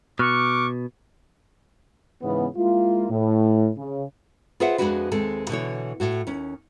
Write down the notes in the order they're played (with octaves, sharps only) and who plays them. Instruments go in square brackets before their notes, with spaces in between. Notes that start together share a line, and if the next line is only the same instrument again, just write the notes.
[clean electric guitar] B2 [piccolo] C#6 [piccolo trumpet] D6 [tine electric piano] F6 F#6
[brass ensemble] G#2 C#3 E3 B3
G#3 A#3 E4 F4
A2
C#3
[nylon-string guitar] F4 G#4 B4 C5 E5 F#5
F2 G#2 G#3 D4 F#4 B4
D#2 G#3 C4 A4
B2 D3 E3 C#5
A2 F#4
D#2 C#4